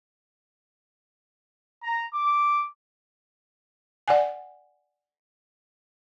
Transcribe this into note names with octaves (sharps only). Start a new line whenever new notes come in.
A#5
D6
D5 F#5 G#5